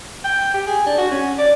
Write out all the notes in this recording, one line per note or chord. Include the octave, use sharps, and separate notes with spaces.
G5
G4
G#4
D4
F#4
C#4
D5